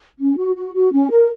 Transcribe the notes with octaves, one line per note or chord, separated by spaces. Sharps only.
C#4
F#4
F#4
F#4
C#4
A#4